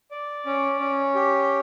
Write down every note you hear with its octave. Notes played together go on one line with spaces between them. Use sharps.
D5
C#4
C#4
G4